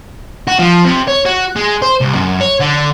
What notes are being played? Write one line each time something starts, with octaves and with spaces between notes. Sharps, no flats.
F#4
F3
C3
C#5
F#4
G#3
C5
C2
F#2
C#5
D3